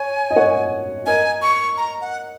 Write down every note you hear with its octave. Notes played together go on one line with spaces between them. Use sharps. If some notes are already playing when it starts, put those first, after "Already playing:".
Already playing: C#5 G#5
D#5
C#5 F#5
A#4 D#5 G#5
C#6
A#5
F#5